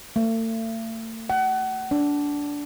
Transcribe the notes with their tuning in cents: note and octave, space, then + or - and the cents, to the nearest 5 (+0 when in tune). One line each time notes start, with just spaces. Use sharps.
A3 +40
F#5 +30
D4 -15